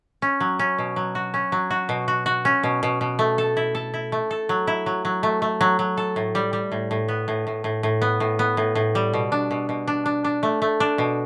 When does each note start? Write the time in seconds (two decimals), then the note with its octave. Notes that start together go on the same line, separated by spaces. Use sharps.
0.22 C#4
0.40 F#3
0.59 C#4
0.78 B2
0.96 F#3
1.15 F#4
1.34 C#4
1.52 F#3
1.71 F#4
1.89 B2
2.08 F#4
2.26 F#4
2.45 C#4
2.63 B2
2.83 B2
3.01 B2
3.19 A3
3.38 A4
3.57 E4
3.75 A4
3.94 E4
4.12 A3
4.31 A4
4.49 F#3
4.67 E4
4.86 F#3
5.05 F#3
5.23 A3
5.42 A3
5.61 F#3
5.79 F#3
5.97 A4
6.16 A2
6.35 G3
6.53 G3
6.72 A2
6.91 A2
7.08 B3
7.28 A2
7.47 A2
7.64 A2
7.83 A2
8.02 B3
8.20 A2
8.39 B3
8.57 A2
8.75 A2
8.95 G3
9.14 B2
9.32 D4
9.51 B2
9.69 B2
9.88 D4
10.06 D4
10.25 D4
10.43 A3
10.62 A3
10.80 D4
10.98 B2